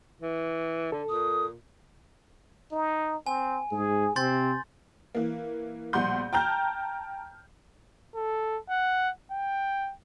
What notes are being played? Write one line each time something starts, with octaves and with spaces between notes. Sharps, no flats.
E3
D3 A4
A#2 D#6
D#4
C4 G#5
G#2 G#4
C3 C4 C6 G6 A6
E3 A#3
A#1 B2 G3 F#5 C6 G6
G5 A5 A#5 F6 G6
A4
F#5
G5